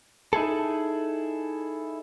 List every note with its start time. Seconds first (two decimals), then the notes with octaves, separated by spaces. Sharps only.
0.33 D#4 E4 G#4 A4